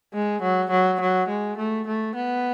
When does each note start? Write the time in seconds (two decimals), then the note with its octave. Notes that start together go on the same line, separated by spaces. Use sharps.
0.14 G#3
0.42 F#3
0.71 F#3
1.01 F#3
1.28 G#3
1.58 A3
1.87 A3
2.15 B3